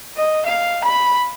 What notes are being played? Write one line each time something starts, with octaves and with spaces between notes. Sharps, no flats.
D#5
F5
B5